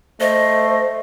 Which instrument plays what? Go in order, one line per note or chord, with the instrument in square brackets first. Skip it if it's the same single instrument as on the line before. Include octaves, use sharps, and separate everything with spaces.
[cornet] A3 [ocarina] C5 [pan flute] D#5